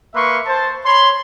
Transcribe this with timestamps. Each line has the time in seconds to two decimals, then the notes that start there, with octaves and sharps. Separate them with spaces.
0.14 A#3 B4 E5 C6 C#6
0.46 C5 A5
0.86 C#5 B5 C6